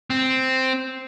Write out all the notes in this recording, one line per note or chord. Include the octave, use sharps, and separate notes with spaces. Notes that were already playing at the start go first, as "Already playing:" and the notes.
C4